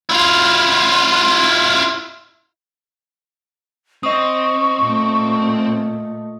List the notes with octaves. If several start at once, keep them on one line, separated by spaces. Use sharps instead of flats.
E4 F4
C4 D#5 C#6 D#6
A#2 A3